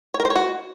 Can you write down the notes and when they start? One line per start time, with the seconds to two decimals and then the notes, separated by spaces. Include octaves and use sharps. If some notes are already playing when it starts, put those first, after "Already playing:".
0.14 C#5
0.20 A#4
0.25 C5
0.30 C#5
0.35 F#4